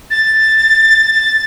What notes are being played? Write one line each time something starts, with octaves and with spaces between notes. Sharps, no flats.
A6
A6